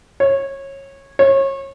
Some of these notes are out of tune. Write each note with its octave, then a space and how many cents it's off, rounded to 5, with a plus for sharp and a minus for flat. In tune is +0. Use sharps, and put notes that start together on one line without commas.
C#5 -20
C#5 -30